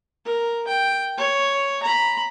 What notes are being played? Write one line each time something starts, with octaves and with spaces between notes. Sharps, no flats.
A#4
G5
C#5
A#5 B5